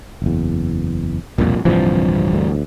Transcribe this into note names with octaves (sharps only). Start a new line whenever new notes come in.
F#1 E2
E1 C2 F2 A#2
D1 G2 C3 E3 F3
D2